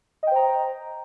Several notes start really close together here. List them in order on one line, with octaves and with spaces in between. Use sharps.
D#5 G5 C5 A#5